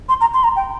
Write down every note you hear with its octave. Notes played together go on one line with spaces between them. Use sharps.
C6
A#5
C6
A#5
G5